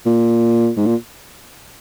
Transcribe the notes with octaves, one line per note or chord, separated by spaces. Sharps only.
A#2
G#2
A#2